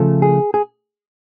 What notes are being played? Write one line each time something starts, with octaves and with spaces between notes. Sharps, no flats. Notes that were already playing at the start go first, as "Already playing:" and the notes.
Already playing: C#3 F3 A3
G#4
G#4